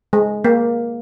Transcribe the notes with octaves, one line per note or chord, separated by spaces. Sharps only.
G#3
A#3